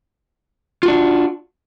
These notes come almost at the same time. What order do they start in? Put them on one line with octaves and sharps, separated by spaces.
F4 F#4 D4